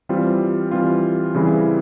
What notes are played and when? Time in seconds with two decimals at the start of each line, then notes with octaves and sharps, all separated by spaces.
0.09 E3 G3 C4 F4
0.71 E3 G3 C4 F4
1.34 C#3 E3 G3 C4 E4